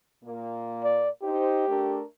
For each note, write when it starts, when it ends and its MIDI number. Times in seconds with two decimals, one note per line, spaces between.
0.25 1.05 46
0.25 1.05 58
0.84 1.10 74
1.23 1.66 63
1.23 2.00 67
1.23 1.66 72
1.68 2.02 57
1.68 2.02 62
1.68 2.02 70